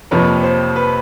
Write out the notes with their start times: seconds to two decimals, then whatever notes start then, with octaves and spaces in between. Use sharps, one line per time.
0.11 F2 C3 F3 A#3 B4 C#5
0.43 C5
0.76 B4